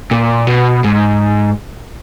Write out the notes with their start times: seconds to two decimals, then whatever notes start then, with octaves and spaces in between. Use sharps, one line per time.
0.11 A#2
0.47 B2
0.84 G#2